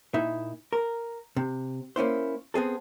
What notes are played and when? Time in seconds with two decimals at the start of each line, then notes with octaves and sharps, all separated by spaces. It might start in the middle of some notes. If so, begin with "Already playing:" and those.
0.14 A#2 D#4 E4 E5
0.73 A#4
1.37 C3
1.96 A#3 C#4 E4 C5
2.54 B3 C4 G#4 A4